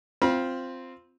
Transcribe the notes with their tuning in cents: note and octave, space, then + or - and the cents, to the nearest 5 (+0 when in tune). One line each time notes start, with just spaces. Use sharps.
C4 +0 F4 +0 B5 -35